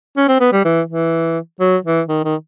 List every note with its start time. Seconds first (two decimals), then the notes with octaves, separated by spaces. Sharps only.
0.17 C#4
0.28 C4
0.40 B3
0.52 G3
0.64 E3
0.88 E3
1.60 F#3
1.85 E3
2.08 D#3
2.24 D#3